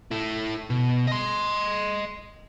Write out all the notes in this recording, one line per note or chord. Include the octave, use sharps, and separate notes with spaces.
E4 A4
B2
D#5 C6